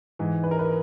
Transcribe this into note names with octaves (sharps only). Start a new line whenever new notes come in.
G#2 E3
B4
A#4
B4